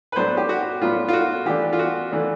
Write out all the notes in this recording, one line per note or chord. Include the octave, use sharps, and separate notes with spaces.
B4
A2 F#3 B3 D4 C5
G4
F#4
A2 F#3 B3 D4 F4
F4
F#4
E3 A3 D4 G4
F4
F#4
E3 A3 D4